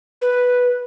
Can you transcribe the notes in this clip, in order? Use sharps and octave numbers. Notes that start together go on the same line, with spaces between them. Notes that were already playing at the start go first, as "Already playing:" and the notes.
B4